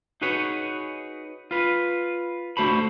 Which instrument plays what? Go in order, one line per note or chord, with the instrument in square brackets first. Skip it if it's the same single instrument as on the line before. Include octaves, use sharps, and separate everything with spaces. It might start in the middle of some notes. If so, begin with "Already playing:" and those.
[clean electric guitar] D#4 F#4 G#4 B4 C#5
F4 B4
D3 A3 F#4 C5 A5 B5